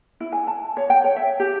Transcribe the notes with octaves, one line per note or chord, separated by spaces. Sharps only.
E4
G#5
A5
C#5
G5
C#5
E5
G4